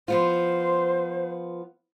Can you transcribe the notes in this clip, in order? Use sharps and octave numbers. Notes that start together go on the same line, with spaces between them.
F3 B3 F4 C5